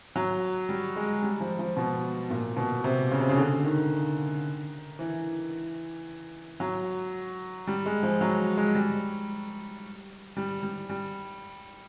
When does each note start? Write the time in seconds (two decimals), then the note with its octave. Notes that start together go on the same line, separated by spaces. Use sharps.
0.16 F#3
0.69 G3
0.96 G#3
1.23 G3
1.41 F3
1.59 F3
1.77 B2
2.30 A#2
2.57 B2
2.84 C3
3.11 C#3
3.20 C3
3.29 C#3
3.37 D3
3.64 D#3
4.99 E3
6.60 F#3
7.67 G3
7.86 G#3
8.03 F3
8.21 F#3
8.57 G#3
8.75 G3
10.37 G3
10.63 G3
10.89 G3